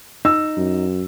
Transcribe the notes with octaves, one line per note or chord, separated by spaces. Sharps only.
D#4 E6
F#2